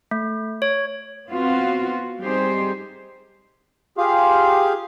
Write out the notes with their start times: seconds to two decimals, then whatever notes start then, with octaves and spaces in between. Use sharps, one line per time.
0.11 A3
0.62 C#5
1.31 B3 C4 F4 F#4
2.21 G3 C4 D#4 G4 G#4 C5
3.98 F4 G4 G#4 F5